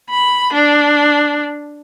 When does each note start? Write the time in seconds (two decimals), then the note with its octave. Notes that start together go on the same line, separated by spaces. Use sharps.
0.10 B5
0.53 D4